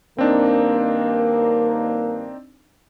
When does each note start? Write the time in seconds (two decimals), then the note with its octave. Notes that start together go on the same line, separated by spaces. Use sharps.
0.18 G2 D#3 A#3 C4 D4 D#4